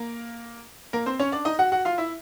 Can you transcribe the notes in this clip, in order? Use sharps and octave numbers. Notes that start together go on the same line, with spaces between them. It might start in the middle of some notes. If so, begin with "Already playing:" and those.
Already playing: A#3 A#4
A#3 A#4
C4 C5
C#4 C#5
D4 D5
D#4 D#5
F#4 F#5
F#4 F#5
F4 F5
E4 E5